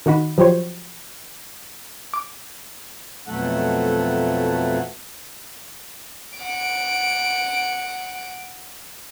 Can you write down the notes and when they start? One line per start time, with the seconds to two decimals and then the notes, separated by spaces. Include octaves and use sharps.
0.06 D#3 D#4 F#4 B5
0.38 F3 F#3 G4 C5 C#5
2.14 D6
3.28 F2 B2 F#3 A3 A4 F#5
6.38 F#5 D7